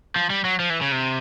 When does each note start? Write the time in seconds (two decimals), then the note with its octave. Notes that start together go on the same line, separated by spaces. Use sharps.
0.16 F3
0.30 G3
0.45 F#3
0.59 F3
0.70 E3
0.81 C#3
0.92 C3